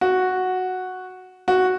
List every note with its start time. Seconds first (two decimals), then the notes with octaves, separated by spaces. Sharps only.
0.01 F#4
1.48 F#4